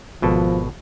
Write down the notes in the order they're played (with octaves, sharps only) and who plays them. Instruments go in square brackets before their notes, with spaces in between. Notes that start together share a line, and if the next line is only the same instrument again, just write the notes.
[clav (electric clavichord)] G#1 B2 A4 [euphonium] F3